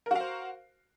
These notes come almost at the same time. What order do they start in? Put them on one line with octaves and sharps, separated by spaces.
A#4 F#4 F5 C5